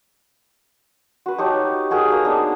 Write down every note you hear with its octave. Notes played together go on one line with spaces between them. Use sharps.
F#4 B4
D#4 G4 C#5 A5
D#4 F#4 G#4 A#4
A#3
B3 D4 D#4